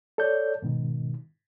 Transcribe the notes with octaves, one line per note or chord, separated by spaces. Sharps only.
A4 C#5 D5 G6
G#2 B2 D#3